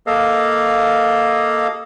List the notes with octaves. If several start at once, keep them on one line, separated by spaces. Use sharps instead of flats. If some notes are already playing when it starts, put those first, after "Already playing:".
A#3 A4 D#5 F5